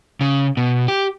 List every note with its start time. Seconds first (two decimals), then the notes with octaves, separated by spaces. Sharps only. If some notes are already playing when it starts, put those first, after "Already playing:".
0.21 C#3
0.57 B2
0.88 G4